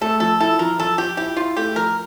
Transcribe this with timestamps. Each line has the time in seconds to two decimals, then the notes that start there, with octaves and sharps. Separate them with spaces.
0.01 A3 A4
0.20 F3 A4
0.40 E4 A4
0.59 F3 A#4
0.79 F3 A4
0.98 F3 G4
1.17 E4 G4
1.36 E4 F4
1.57 A3 G4
1.76 F3 A#4